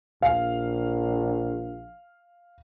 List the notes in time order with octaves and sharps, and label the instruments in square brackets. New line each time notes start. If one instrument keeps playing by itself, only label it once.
[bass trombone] A#1 [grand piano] F5